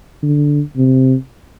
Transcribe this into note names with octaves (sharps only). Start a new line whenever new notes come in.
D3
C3